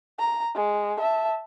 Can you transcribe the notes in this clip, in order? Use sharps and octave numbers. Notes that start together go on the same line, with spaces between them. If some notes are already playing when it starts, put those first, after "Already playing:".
A#5
G#3
E5 A5